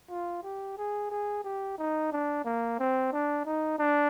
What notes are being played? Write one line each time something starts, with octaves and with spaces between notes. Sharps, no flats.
F4
G4
G#4
G#4
G4
D#4
D4
A#3
C4
D4
D#4
D4